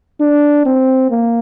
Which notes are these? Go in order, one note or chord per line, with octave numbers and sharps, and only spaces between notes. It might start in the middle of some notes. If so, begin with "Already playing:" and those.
D4
C4
A#3